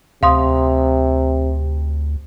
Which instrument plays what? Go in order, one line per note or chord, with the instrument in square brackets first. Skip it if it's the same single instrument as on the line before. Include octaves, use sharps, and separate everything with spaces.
[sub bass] D2 [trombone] C3 [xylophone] F5 C6 D#6